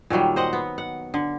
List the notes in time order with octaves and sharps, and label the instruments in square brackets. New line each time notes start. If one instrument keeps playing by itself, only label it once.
[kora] A#2 D#3 F#3 G3
C5 D#5 F#5
B3
F#5
D3